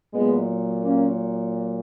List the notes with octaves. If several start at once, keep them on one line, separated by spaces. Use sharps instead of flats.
A#2 F#3 G#3 B3
A#3 C#4